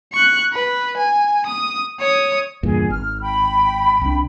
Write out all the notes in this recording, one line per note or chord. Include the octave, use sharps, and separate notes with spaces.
C#6 F#6
B4
G#5
D#6
C#5 D#6
E2 G2 A#2 G#4
G#1 F6
G5 B5
C2 D4